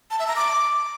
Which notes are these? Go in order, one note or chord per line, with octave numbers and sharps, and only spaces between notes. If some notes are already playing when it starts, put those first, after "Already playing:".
A5
E5
A#5
D6